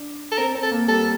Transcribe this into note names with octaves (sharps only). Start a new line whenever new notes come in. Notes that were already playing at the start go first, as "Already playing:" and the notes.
Already playing: D4
A4
C4 A#4
C4
A4
A#3
G3 A4